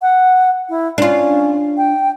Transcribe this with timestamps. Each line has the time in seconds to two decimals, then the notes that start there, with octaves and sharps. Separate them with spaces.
0.02 F#5
0.69 E4
0.98 C#4 D4 F4
1.77 G5